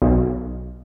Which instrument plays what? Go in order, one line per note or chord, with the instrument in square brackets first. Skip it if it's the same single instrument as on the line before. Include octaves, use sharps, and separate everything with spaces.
[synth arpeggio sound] B1